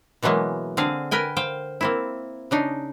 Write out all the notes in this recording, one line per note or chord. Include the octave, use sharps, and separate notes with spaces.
B2 E3 F#3 G#3 A#3
D3 C4 G#4 F5
A#4 B4 G5 G#5
C5 F5 G5
A#3 C4 E4
C#3 D4 D#4